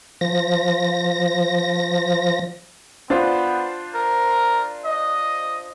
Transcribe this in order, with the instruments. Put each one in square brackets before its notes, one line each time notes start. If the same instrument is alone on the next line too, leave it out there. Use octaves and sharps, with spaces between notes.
[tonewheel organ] F3 A#6
[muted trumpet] B3 [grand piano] D4 F4 C5
[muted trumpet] A#4
D#5